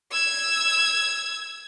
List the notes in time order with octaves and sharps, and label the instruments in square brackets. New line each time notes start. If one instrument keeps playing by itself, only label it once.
[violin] E6 G#6